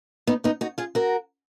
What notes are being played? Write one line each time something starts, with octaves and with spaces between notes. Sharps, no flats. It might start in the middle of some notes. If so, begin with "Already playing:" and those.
B3 D#4
B3 D#4
D#4 F#4
F4 G#4
F#4 A#4